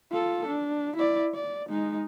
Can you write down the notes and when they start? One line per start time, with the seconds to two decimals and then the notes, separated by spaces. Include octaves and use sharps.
0.11 F4 A4
0.48 D4
0.96 E4 D5
1.34 D5
1.69 G#3 D#4